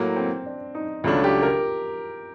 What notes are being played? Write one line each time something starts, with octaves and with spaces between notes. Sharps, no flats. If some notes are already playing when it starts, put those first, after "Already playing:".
Already playing: A2 F#3 A#3
C4
D4
D#4
C#2 C#3 F#3 A3 D4 F4
G4
A#4